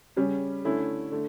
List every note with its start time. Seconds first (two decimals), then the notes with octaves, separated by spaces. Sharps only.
0.16 C#3 G3 C#4
0.64 D3 A3 C#4 E4
1.12 D3 A3